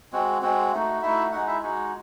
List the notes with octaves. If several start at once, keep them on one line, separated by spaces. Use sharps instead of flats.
G#3 C4 F#4
G#3 C4 F#4
A3 D#4 F#4
A3 D#4 E4 F#4 E5
G#3 D#4 F#4 F#5
E4 E5
G#3 D#4 F#4